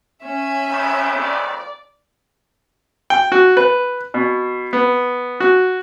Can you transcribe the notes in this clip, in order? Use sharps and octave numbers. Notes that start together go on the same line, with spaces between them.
C#4 E5 G#5
F2 A2 D#3
D5
G5
F#4
B4
B2
B3
F#4